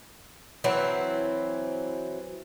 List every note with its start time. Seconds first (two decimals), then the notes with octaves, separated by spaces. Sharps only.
0.64 E3 F#3 C4 E4